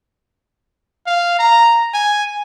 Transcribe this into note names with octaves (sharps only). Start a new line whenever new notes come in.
F5
A#5
G#5